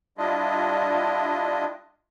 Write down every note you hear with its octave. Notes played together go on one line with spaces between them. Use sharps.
G3 D4 E4 F4 D#5